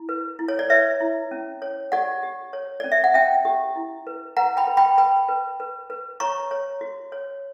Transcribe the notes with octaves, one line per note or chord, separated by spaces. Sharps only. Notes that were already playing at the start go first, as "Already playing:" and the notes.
Already playing: E4
B4
E4
C#5
D5
B4 C#5 E5
E4
C#4
C#5
G4 D5 F#5
G4
C#5
C#4 D5
E5
F#5
C#4 E5 G5
G4
E4
B4
B4 F#5 A#5
G5 B5
B4
G5 B5
B4 G5 B5
B4
B4
B4
C#5 A#5 C#6
C#5
F#4
C#5